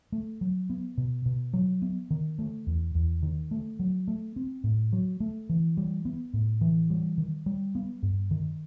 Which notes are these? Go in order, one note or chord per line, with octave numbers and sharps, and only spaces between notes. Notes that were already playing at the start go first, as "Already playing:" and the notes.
A3
F#3
B3
B2
B2
F#3
B3
D#3
A3
E2
E2
D#3
A3
F#3
A3
C4
A2
F#3
A3
E3
G3
B3
A2
E3
G3
D#3
G3
B3
G2
D#3